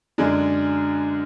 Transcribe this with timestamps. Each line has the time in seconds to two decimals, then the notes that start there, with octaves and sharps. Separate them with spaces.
0.18 F#2 D3 G#3 D4